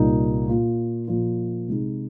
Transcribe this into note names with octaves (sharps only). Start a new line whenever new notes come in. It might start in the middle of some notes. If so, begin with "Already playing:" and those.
Already playing: C2 A#2 A#3 D#4
A#2 A#3 F4
A#2 F3 A#3 F4
C3 G#3 D#4